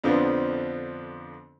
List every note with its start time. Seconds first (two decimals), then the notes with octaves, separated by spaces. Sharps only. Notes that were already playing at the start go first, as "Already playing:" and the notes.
0.04 F2 D3 F3 B3 C4 D4